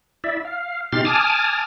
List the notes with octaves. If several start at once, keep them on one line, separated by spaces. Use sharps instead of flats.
E4 D5 E5
F5
B2 D#4 G4 C6 F6 A6
G#5 A5 D6 D#6 F6